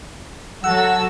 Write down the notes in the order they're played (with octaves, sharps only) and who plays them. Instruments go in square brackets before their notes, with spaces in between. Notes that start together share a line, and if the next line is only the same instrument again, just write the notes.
[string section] F#3 F#4 A4 [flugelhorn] F#5 [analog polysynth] E6